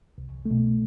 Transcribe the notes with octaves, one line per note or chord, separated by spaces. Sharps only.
C2
A3
B2